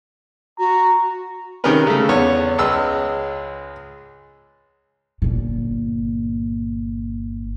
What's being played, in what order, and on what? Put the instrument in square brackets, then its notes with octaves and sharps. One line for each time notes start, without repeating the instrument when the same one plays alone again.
[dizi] F#4 [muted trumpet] A#5
[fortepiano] C3 D#3 C#4 G#4 A#4 B4
C#3 A3
E2 B3 C#5
C#2 G#3 B4 E6
[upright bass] G1 A#2